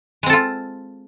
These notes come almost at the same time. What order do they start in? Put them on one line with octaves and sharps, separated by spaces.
G#3 C4 A4 F4